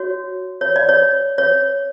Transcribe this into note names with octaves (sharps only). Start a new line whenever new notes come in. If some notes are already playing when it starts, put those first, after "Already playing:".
Already playing: F#4 C#5
C#5
D5
C#5
C#5